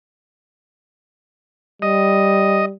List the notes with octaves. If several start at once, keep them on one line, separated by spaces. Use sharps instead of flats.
G3 D#5